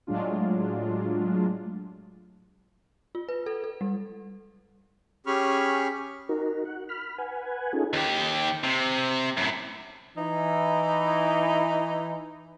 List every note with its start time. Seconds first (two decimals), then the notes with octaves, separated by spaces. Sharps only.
0.07 A2 F#3 G#3 D4 F4
3.15 F4
3.29 B4
3.46 A4
3.64 A4
3.81 G3
5.27 C#4 G4 G#4 B5 C#6 F6
6.29 D#4 F#4 A#4
6.65 F#5
6.89 B5 F6
7.18 B4 F#5 G#5
7.73 C#4 D#4 F4 G#4 A4
7.93 D#2 G4
8.63 C3
9.37 F#2 A2
10.16 E3 D#4 E4